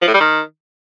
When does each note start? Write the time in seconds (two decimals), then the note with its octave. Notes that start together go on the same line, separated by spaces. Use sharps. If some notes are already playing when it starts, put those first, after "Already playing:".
0.01 F3
0.08 A2
0.14 G3
0.20 D#3